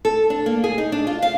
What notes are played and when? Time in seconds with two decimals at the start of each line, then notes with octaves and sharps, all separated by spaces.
0.05 A4
0.30 D4
0.46 A#3
0.64 G#4
0.78 D#4
0.92 D4
1.07 F4
1.22 F5